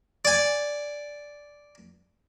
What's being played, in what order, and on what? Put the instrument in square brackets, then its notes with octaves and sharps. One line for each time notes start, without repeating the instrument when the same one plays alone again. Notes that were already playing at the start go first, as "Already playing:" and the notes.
[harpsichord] D5 G#5